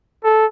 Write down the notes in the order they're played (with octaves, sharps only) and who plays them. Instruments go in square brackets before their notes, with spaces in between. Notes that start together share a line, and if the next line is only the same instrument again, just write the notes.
[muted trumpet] A4